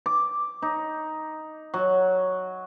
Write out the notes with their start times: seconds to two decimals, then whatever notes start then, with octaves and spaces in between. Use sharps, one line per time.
0.06 D6
0.62 D#4
1.74 F#3